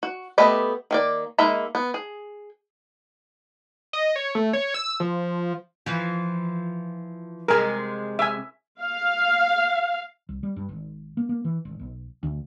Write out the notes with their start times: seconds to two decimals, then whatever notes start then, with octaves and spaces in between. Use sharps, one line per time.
0.03 F#4
0.38 A3 B3 G4 D#5 B5
0.91 D#3 A#3 D5
1.38 G#3 A#3 D#4 E5 B5
1.75 B3
1.94 G#4
3.93 D#5
4.16 C#5
4.35 A3
4.53 C#5
4.74 E6
5.00 F3
5.86 E3 F3
7.48 C3 G#3 A#4 G#5
8.19 E5 G#5
8.81 F5
10.29 C2
10.43 G3
10.56 G2
10.69 G#1
11.17 A#3
11.29 A#3
11.45 E3
11.65 G#1
11.79 B1
12.23 D2